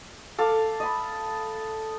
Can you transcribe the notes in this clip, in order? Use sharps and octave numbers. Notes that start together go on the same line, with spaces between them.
A4 F5 D6
D#5 B5